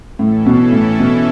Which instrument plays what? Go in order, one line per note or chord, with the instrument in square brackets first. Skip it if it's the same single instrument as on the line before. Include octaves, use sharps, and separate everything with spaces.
[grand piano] A2 [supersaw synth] E3 C#4 E4 A4
[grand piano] B2
A2
B2